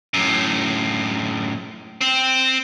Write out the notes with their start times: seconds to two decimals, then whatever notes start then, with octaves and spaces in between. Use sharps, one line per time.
0.14 F#2 A2
2.01 C4